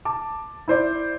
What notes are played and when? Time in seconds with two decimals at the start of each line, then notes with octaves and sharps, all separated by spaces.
0.05 A5 D6
0.68 E4 C5 D5